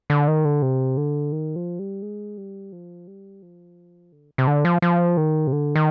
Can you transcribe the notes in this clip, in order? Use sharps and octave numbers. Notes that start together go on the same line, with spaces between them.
D3
D#3
D3
C3
D3
D#3
F3
G3
G#3
G3
F3
G3
F3
D3
C3
D3
F3
F3
D#3
C3
D3
D#3